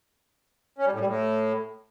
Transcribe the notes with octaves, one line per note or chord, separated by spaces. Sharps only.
C#4
G3
A2
G3
A2